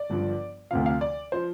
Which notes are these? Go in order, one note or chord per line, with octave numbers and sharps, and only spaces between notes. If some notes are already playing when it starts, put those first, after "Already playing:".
Already playing: D5
G1 G2 F3
D2 C3 F3 F5
F5
D5
F3 C5